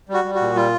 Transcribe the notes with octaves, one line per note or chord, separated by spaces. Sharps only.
G3 F#4
G3
F#4
A#2
G3 F4